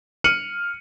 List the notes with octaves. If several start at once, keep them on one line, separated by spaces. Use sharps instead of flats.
F6 C#7 D#7 F#7